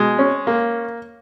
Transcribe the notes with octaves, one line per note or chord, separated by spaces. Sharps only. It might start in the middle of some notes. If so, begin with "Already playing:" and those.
Already playing: B2 G#3
C#4
A#3